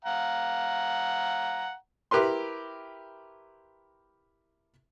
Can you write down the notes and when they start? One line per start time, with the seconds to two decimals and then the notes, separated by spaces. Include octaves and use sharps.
0.04 F5 F#5 A#5
2.11 E4 G4 A#4 B4 C6